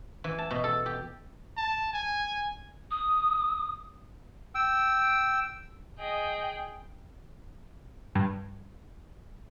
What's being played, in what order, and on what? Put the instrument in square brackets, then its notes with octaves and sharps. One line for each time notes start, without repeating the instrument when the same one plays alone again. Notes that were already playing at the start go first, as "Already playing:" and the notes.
[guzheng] E3
A5
B2
A4
G4
[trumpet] A5
G#5
[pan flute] D#6
[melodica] G5 E6
[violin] G#4 G5 [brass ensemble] D#5
[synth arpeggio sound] G2